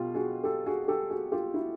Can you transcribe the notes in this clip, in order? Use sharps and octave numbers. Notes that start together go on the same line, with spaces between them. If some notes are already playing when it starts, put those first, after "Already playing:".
Already playing: B2 F4 G4
F#4 G#4
G4 A4
F#4 G#4
G4 A4
F#4 G#4
F4 G4
E4 F#4